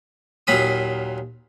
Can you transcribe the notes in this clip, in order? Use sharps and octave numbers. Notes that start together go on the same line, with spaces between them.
D#2 A#2 F#3 B5 D#6